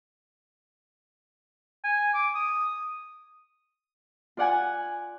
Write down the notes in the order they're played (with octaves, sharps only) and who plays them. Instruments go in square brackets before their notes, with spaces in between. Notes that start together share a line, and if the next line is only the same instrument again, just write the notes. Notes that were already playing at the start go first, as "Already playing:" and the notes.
[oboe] G#5
D6
D#6
[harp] F4 D5 F#5 G#5